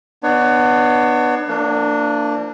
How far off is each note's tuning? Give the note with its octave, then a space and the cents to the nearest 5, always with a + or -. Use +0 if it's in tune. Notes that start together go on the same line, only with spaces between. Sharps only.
B3 +0 D4 +35 C#5 +15
F3 -40 A#3 -35 D4 +0